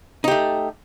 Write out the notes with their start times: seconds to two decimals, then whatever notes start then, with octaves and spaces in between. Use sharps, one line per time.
0.24 D#4
0.28 G4
0.31 A3